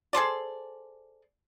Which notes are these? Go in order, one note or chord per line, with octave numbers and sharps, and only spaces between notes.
G#4 A4 C5 D5